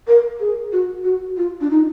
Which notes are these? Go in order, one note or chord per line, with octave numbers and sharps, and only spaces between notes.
A#4
G#4
F#4
F#4
F4
D4
D#4